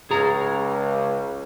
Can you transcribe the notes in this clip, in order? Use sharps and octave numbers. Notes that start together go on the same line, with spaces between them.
C#2 G#4 A#5